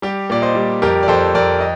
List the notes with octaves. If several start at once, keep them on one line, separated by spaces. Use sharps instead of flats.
G3 G4
A#2 D5
C5 D#5
G3
F2 G4 A#4
D5
F2 A4 C5
F2 A#4 D5
D#5